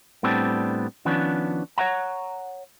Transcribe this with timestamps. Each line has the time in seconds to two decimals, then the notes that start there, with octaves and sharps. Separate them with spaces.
0.23 A2 G3 B3 C4 D4
1.05 D#3 F3 B3 C#4 D4
1.78 C#5 F5 F#5 A#5